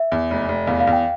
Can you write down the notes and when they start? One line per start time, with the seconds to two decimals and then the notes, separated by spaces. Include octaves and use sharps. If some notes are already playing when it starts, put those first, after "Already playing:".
Already playing: E5
0.12 E2
0.30 F1
0.49 F1
0.67 E2 F5
0.80 F5
0.87 E2
0.93 G5